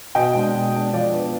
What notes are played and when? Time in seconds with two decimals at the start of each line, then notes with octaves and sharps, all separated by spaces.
0.15 B2 D#5 G5
0.35 G#3 D4
0.54 B2
0.74 G#3 D4
0.93 F3 D5 F5
1.13 B3 D4